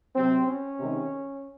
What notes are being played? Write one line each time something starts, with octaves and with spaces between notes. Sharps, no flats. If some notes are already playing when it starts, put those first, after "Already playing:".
C3 F#3 C4
C#4
C3 D#3 G#3